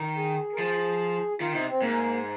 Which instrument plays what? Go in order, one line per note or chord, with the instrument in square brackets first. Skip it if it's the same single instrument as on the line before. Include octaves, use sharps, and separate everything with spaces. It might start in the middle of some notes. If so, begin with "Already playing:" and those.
Already playing: [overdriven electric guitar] D#3
[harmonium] G#4
A#4
[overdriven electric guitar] F3 [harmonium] G#4
[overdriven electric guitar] D#3 [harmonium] F4
[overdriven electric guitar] C3 [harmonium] D#4
[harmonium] C4
[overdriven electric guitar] G#2 [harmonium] A#3